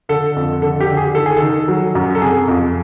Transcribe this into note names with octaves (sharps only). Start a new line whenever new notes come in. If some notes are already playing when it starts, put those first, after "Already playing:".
D3 A4
F2
D3 A4
G4
D3
G#4
D#3 A4
G#4
A4
D#3
F#3
F#2
A4
C3 G#4
F2